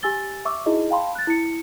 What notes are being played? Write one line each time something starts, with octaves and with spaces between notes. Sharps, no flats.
G4 G#5 E6 A6 G7
E5 C#6 D6 E6
D#4 E4 F#4 G#4 D#5
F5 G5 A5 B5 C6
F#6 A6
E4 C#7